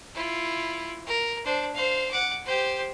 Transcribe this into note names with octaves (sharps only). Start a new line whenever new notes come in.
E4 F4
A#4
D4 C5
C5 F5
F#5 D6
G4 C5